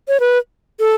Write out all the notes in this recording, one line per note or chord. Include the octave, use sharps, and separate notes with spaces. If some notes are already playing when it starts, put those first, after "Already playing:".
C#5
B4
A4